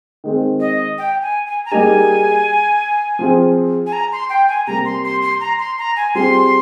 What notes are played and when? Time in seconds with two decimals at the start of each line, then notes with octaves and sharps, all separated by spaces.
0.24 D#3 G#3 C4
0.60 D#5
0.98 G5
1.22 G#5
1.47 G#5
1.65 A#5
1.72 G3 A#3 D#4 G#4 G#5
3.19 F3 C4 F4 G#4
3.87 G#5
3.93 A#5
4.12 C6
4.30 G5
4.49 G#5
4.67 C3 G3 A#3 A#5
4.85 C6
5.04 C6
5.22 C6
5.40 A#5
5.59 C6
5.79 A#5
5.96 G#5
6.15 G3 C4 F4 G#4 C6